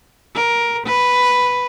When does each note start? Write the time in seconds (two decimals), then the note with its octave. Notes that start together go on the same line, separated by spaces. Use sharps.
0.35 A#4
0.86 B4